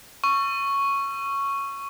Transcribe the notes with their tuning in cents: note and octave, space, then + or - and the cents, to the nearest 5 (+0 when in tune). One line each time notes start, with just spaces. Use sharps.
C#6 +0 E6 +45